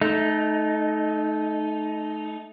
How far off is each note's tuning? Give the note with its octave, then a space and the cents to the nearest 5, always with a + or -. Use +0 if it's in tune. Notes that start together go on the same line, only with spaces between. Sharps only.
A3 -25 D#4 +0